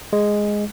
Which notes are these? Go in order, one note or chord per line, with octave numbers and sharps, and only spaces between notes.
G#3